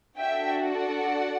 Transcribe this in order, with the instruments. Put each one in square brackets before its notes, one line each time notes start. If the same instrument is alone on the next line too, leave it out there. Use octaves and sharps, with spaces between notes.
[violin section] D4 F#4 A4 E5 G5
D5 F#5